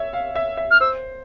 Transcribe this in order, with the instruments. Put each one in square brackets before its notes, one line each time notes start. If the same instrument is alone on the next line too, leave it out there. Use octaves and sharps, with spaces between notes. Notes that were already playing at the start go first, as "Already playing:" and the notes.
Already playing: [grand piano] C#5 E5
F5
E5
E5
[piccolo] F6
[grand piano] C5 [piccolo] E6